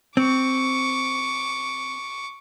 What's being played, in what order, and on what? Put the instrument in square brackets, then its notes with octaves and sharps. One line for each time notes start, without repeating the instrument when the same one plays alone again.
[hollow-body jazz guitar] C4 [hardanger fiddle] C#6 D6